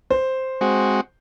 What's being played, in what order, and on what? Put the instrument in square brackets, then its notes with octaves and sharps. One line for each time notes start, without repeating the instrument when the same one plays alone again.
[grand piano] C5
[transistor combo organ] G#3 C4 F#4